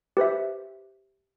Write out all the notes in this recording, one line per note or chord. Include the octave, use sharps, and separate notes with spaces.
G4 B4 C5 E5